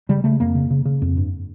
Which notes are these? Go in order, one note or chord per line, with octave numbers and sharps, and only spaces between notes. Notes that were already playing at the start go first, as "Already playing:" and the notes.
C#3 G3
C#3 A3
F2 A#3
C#3
C#3
C#3
F2
G2